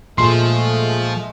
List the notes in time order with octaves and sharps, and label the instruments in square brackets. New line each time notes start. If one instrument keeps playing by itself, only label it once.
[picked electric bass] A#2 [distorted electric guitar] F3 F4 [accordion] G#3 A3 [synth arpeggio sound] C6